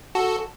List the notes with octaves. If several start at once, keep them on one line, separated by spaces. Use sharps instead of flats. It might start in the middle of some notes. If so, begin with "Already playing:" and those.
F#4 A4